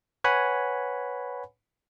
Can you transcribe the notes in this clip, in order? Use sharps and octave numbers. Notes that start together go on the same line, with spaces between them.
B4 C#5 F#5 G#5 B5